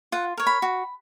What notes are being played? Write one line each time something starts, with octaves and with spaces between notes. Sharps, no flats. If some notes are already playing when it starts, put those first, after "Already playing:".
F4 F#5
A#4 C#5
B5
F#4